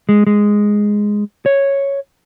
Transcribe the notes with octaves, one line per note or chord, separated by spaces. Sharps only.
G#3
G#3
C#5